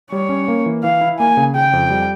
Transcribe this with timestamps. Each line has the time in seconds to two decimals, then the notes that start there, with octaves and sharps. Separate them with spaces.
0.12 G3 C#5
0.29 C#4
0.48 A#3
0.66 E3
0.83 E3 F5
1.01 E4
1.19 A#3 G#5
1.37 C#3
1.55 C#3 G5
1.73 F2
1.90 G3